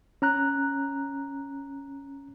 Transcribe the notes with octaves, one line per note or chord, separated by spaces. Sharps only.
C#4 A#5 F#6